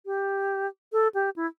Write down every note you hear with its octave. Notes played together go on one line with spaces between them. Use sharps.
G4
A4
G4
E4